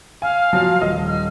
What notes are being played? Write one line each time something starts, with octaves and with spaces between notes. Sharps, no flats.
F5 G#5
F3 F#3
D#1 D#5
F6